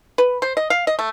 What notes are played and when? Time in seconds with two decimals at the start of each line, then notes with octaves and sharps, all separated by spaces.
0.18 B4
0.42 C5
0.57 D#5
0.70 F5
0.87 D#5
0.99 A3